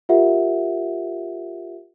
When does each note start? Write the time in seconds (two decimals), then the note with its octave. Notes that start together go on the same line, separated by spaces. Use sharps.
0.09 F4 G4 A#4 E5 F#5